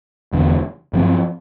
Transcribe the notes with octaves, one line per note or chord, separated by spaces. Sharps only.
E1 E2 D3
G2 F3 C4